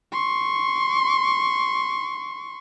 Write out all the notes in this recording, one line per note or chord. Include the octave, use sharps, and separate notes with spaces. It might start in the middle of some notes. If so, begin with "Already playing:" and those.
C6 C#6